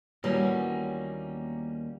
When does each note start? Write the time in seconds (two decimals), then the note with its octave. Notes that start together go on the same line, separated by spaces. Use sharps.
0.24 D#2 E3 F#3 G3 A#3 B3 C#4